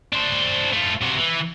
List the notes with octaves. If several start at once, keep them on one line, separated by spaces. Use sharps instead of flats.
D4 C5
A3 F4
C3 F#4
E3